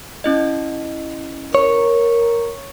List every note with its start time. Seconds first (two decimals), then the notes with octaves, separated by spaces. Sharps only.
0.24 C#4 E4 D#5
1.55 A#4 C#5